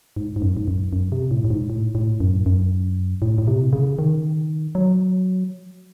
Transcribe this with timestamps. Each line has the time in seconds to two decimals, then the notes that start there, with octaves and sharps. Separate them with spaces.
0.16 G#2
0.36 G#2
0.42 F#2
0.57 G#2
0.68 F#2
0.93 F#2
1.12 C3
1.31 A2
1.45 A2
1.50 G#2
1.70 A2
1.95 A2
2.20 F#2
2.46 F#2
3.22 A2
3.38 A2
3.47 C3
3.73 C#3
3.99 D#3
4.75 F#3